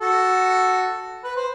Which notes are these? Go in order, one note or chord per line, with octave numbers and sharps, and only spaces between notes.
F#4 A4
B4
C5